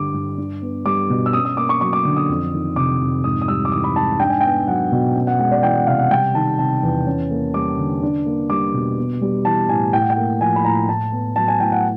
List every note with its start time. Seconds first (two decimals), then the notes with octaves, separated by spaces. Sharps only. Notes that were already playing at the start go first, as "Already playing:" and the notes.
Already playing: G2 D3 G3 D6
0.14 G2
0.38 D4
0.62 B3
0.85 G3 D6
1.10 B2
1.26 E6
1.33 C#4 D#6
1.45 D#6
1.57 A#3 D6
1.69 C#6
1.81 F#3 C#6
1.93 D6
2.05 D3
2.17 D#6
2.29 F2
2.53 D#3
2.76 C3 D6
3.01 F2
3.24 G#2 D#6
3.42 D#6
3.48 G3 E6
3.65 D6
3.72 E3 D#6
3.84 B5
3.96 G#2 A5
4.20 D4 G5
4.30 G#5
4.41 B3 G5
4.68 F#3 F#5
4.92 B2
5.15 C#4
5.27 F#5
5.39 G#3 F#5
5.51 D5
5.63 E3 G5
5.75 F#5
5.87 C3 F5
5.99 F#5
6.11 G3 G5
6.34 D#3 A5
6.59 C3 A5
6.83 E2
7.06 C#4
7.30 A#3
7.54 G3 D6
7.78 D3
8.03 D4
8.26 A#3
8.50 G3 D6
8.74 B2
8.98 B3
9.21 G3
9.45 E3 A5
9.69 A2 G#5
9.93 A2 G5
10.01 F#5
10.10 G5
10.17 A#3
10.41 F3 G#5
10.56 B5
10.65 A2 A#5
10.89 A2 A5
11.12 B3
11.36 F#3 A5
11.48 G#5
11.60 A2 G5
11.72 F#5